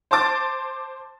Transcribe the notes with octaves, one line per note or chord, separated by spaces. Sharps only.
C5 A5 C6 D6 A6